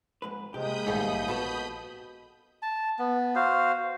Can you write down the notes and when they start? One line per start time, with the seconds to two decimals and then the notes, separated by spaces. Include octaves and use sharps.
0.22 F2 G#2 B4
0.54 C3 G#3 A#3 G4 B5 D#6 G6
0.87 A#1 D#2 G#2 G3 A3 D#4
1.28 B2 A4 B4
2.62 A5
2.99 B3
3.35 F#4 C5 F5